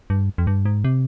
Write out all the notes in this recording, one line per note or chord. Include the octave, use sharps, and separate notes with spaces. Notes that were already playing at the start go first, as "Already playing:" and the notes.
G2
F2
G2
G#2
C3